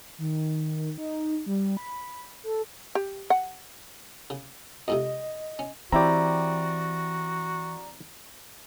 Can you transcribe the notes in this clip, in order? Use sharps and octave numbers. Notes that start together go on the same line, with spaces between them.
D#3
D#3
D#4
G3
B5
A4
G4
F#5
C#3
F2 G#2 C3 D#5
C#4
E3 C4 E4 F#4 G4 D5 A#5